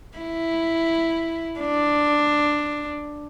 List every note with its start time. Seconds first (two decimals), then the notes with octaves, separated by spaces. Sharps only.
0.18 E4
1.60 D4